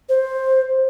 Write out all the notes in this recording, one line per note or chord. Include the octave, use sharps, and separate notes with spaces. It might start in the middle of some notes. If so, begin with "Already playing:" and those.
C5